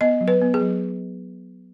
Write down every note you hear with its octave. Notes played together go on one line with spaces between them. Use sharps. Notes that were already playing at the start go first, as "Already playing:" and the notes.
B3 D#5
F#3
B4
B3
G#4
F#3